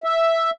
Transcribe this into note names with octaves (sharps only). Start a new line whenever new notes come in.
E5